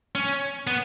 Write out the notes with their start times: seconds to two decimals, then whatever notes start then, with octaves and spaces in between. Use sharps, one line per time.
0.15 C#4
0.67 B3